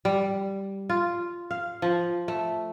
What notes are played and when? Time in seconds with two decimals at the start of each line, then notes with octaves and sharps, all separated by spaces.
0.05 G3
0.90 F4
1.51 F5
1.82 F3
2.28 A3